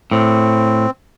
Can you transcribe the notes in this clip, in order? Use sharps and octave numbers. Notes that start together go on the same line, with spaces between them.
A2 C4